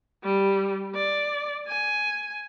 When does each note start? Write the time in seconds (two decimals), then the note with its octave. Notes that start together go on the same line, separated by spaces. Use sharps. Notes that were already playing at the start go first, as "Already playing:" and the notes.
0.24 G3
0.94 D5
1.67 G#5